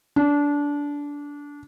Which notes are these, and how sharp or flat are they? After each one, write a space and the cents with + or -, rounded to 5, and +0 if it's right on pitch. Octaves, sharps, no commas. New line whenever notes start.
D4 -20